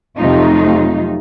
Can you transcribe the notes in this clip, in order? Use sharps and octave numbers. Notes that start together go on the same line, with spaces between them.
F2 C3 F#3 A3 D#4 F4